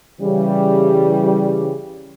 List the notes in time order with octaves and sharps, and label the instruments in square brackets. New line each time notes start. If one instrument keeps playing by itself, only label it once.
[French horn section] C#3 E3 G3